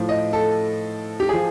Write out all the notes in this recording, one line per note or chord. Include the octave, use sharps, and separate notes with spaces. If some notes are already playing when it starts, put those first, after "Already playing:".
Already playing: A2 F3
D#5
A4
G4
F3 G#4